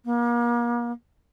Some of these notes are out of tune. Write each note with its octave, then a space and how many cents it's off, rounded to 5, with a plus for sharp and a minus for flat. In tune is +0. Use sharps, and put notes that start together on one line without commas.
A#3 +35